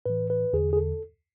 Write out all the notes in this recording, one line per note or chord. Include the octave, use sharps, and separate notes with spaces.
A2 E3 B4
B4
E2 D3 G#4
G#4
A4